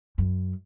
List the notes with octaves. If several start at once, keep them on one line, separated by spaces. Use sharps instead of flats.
F#2